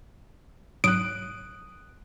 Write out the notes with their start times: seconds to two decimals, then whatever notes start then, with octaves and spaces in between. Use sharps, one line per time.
0.84 G#2 C3 F#3 D#6 F#6 D7